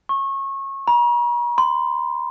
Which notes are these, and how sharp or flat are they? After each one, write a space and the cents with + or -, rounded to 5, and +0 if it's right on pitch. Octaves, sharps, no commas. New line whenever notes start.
C#6 -25
A#5 +45
C6 -25